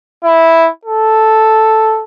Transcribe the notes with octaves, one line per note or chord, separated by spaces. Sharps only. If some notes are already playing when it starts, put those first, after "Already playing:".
E4
A4